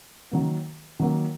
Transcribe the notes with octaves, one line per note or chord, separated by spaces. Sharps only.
D#3 F#3 A#3
D#3 F#3 A#3